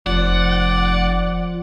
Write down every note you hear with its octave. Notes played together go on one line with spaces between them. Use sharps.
F1 F3 D5 F#5